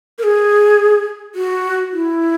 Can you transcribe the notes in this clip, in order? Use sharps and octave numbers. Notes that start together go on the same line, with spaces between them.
A#4
G#4
F#4
E4